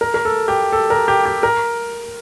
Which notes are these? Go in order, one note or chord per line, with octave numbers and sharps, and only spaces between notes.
A#4
A#4
A4
G4
A4
A#4
G4
G4
A#4